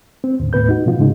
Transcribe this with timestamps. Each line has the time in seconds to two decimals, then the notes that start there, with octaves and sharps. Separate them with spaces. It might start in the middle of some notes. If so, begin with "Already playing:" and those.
0.24 C4
0.40 D#2 A2 D3
0.53 D#2 A2 B3 B4 G6
0.69 D#4 F#4
0.86 B2 F3 B3 F4 F#4
0.99 G#2 C#3 G#3 D#4